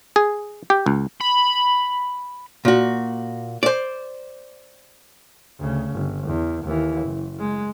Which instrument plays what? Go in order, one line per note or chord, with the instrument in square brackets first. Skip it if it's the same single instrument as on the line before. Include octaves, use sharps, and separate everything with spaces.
[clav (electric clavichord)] G#4
G4
C#2
[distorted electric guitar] B5
[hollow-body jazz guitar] A#2 F#4
C5 D5
[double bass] D2 C#3
G1
E2
D#2 E3
F#1
G#3